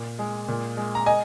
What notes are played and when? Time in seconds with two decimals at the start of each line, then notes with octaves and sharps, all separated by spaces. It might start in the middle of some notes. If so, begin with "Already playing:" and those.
Already playing: A#2
0.19 G#3
0.48 A#2
0.77 G#3
0.95 A#5
1.06 D#5 G#5